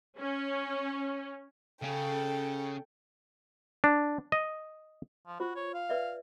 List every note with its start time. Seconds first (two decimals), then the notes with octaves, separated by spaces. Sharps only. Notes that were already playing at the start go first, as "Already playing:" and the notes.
0.19 C#4
1.82 C#3 C#4 A4 G5
3.84 D4
4.32 D#5
5.27 F3
5.40 F4 F#4 C5
5.56 C#5
5.74 F5
5.89 B4 D5 E5